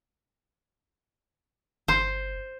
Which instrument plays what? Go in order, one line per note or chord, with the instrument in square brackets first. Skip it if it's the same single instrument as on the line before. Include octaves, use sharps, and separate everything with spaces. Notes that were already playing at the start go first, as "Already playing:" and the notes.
[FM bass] G1 [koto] C5